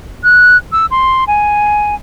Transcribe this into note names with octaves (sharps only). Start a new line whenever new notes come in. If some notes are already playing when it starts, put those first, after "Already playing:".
F#6
E6
C6
G#5